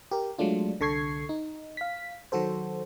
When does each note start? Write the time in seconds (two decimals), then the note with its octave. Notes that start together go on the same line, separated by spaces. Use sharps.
0.11 G4 A#4
0.38 F#3 G#3 A3 D4 F4
0.80 C2 D3 A4 C#6 G#6 C7
1.29 D#4
1.77 F5 B6
2.32 D#3 F#3 F#4 A4 C5